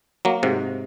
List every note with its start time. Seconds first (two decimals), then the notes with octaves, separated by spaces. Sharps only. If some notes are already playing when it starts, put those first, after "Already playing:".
0.25 F#3 A#3
0.43 G#2 C3